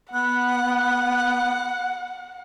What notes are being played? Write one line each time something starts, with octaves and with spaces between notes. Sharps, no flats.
B3 F#5 F#6